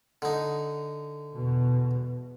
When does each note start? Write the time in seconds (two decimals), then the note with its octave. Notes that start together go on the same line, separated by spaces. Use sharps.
0.22 D3 D#4
1.34 E2 B2